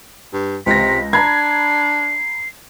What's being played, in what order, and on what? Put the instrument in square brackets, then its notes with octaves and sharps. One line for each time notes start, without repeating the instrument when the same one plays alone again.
[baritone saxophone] G2
[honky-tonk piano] C#2 A#6 [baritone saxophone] C3 [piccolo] B6
[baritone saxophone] D4 [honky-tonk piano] A#5 B5 G#6 [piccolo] C7